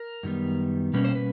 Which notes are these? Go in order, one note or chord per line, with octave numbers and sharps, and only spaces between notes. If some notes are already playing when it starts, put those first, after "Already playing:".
Already playing: A#4
F#2 D#3 G3 B3
B2 G3 A#3 C#4 B4
C5
B4